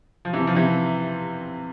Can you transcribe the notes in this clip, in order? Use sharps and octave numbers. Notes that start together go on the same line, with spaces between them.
F3
C3 E3
F3
C3 E3